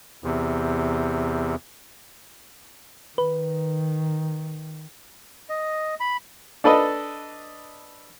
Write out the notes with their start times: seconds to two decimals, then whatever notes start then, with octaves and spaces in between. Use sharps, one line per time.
0.24 E2 C3
3.18 D#3 B4
5.49 D#5
6.00 B5
6.64 D4 A4 B4 D#5